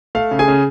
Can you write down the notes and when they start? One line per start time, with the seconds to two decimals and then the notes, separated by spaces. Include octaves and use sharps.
0.15 A3 F5
0.31 C#3
0.39 G#4 G#5
0.48 C#3